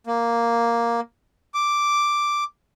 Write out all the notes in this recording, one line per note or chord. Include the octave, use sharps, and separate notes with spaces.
A#3
D6